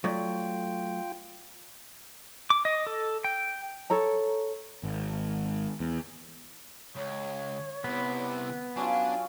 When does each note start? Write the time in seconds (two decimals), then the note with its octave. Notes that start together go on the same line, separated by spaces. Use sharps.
0.04 F#3 A3 F4 D5 G5
2.50 D6
2.65 D#5
2.87 A4
3.24 G5
3.90 A4 C#5 A#5
4.83 G#1
5.80 E2
6.95 C#2 C#5
7.84 C3 B3 E4
8.77 F#3 C#4 D4 F4 G#5